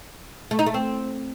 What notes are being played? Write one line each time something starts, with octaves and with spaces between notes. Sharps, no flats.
A3
D#4
A3
C4